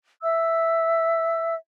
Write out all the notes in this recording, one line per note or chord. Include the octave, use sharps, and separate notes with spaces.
E5 E6